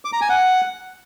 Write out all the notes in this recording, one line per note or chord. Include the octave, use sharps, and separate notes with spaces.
D6
A#5
G#5
F#5